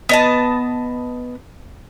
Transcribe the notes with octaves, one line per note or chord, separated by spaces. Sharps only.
B3 D#5 A5